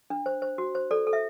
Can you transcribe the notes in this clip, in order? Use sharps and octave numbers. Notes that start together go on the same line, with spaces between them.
D4
C5
C5
F#4
C5
A4 D5
A4
E5